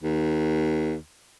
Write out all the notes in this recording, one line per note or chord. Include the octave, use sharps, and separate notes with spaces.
D#2